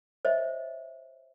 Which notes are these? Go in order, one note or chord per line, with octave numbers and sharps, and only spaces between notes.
C5 C#5 D#5 E5